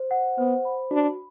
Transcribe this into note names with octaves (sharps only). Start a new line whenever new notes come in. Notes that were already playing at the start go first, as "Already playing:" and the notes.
Already playing: C5
F#5
B3 C5
B5
D4 F#4